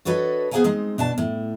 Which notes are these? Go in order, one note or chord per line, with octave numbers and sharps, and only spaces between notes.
D4 F#4 A4 B4 C#5 D#5
B3 G#4 C5 F5 G#5 A#5
G#3 C4 D#4
B2 D4 A5
A2